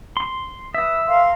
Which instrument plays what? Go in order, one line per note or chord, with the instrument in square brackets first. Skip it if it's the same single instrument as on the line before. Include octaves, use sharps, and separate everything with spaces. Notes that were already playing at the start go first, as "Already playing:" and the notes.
[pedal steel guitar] C6
[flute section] B4 D#6 [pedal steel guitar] E5
[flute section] A#4 F5 C6